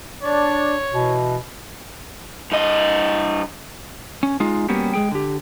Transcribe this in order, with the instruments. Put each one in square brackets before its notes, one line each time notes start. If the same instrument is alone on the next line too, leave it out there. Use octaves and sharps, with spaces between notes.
[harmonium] D4 D5 [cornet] C#5
[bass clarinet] B2 [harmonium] E3
[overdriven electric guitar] G2 D#5
[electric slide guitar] C#4
G#3 D#4 F4
G3 A#3 B3 C#4 F#4 G4
G#3 G#4 G5
D3 G4